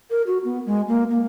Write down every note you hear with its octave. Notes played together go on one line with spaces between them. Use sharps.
A#4
F#4
B3
G#3
A#3
A#3